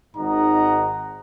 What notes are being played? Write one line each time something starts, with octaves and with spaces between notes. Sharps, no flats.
G#1 G#2 D#4 D#5 F#5 A#5